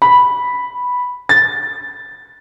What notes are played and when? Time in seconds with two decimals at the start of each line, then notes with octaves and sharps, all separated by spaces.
0.02 B5
1.29 A6